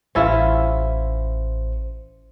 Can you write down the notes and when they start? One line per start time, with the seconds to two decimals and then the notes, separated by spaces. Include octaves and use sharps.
0.15 A1 C#4 E4 F4 C5